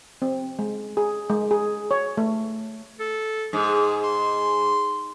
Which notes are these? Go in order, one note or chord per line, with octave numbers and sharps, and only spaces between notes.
C4
G#3
G#4
G#3
G#4
C#5
A3
A4
G#2 G#4
C6